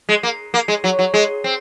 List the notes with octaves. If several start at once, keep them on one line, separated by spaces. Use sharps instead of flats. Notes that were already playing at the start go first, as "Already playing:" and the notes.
G#3
A#3
A#3
G#3
F#3
F#3
G#3
C4